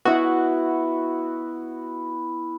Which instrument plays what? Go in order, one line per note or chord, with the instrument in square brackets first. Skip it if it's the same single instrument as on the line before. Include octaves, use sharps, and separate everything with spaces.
[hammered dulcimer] B3 E4 [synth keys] F#4